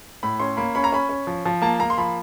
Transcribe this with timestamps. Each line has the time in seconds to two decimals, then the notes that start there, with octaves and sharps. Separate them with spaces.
0.23 A2 B5
0.39 C#4 C6
0.57 A#3 B5
0.75 C#4 B5
0.84 A#5
0.92 C#4 B5
1.09 C#4
1.27 F3
1.45 F3
1.62 A#3 A5
1.80 A#3 A#5
1.90 C6
1.98 F3 B5